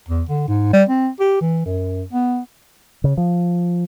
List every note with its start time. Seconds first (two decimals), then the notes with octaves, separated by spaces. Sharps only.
0.09 E2
0.29 D3
0.48 G#2
0.73 G3
0.89 C4
1.20 G4
1.41 E3
1.65 F#2
2.13 B3
3.04 C#3
3.17 F3